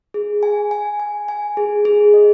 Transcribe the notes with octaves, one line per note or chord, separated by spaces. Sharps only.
G#4
G#5
G#5
G#5
G#5
G#4
G#4
D#5